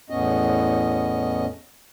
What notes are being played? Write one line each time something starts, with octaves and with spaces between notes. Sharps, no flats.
E2 A2 B3 C#4 D#5